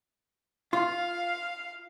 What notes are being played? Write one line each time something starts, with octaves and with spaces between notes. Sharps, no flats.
F4 F5